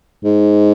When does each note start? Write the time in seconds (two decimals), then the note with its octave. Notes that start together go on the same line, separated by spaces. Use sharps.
0.24 G#2